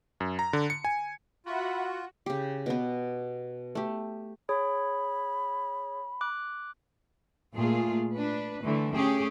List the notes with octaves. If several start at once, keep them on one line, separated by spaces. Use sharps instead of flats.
F#2
A#5
D3
C#7
G#5
F4 F#4 E5 F#5 B5
C#3 G4
B2 B3
A3 G4
G#4 C#5 B5
D6 F#6
A#2 A3 F4 G#4
D4 B4
D3 E3 A3
A3 C#4 G4 G#4